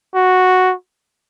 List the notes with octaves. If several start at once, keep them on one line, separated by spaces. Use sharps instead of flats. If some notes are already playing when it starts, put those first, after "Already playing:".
F#4